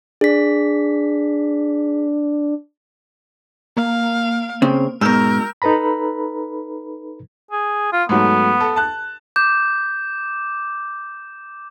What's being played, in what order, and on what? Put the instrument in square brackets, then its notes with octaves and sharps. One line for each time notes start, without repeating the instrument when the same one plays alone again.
[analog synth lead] D4 [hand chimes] G#4 B6
[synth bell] A#3 [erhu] F5
[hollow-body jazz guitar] C#3 C4
[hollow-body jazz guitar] G#2 B2 [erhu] A#4 [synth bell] E6 F6 G6
[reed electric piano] D#4 A4 B4 A#5 B5
[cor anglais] G#4
F4
[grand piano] G#2 F#3 A3 [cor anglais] B3
[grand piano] A4
A5 F#6
[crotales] D6 [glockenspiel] G6